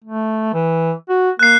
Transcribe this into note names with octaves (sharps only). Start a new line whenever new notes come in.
A3
E3
F#4
A#3 F#6 C7